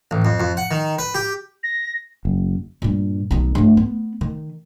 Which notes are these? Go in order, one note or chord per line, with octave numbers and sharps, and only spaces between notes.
A1
F2
F2
F#5
D#3
B4
G4
A#6
F#1
G2 A#2
B1 D#3
G2 A3
B3
D#3